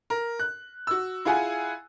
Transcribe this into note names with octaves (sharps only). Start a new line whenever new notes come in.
A#4
F#6
F#4 E6
E4 F4 G#4 F#5 G#5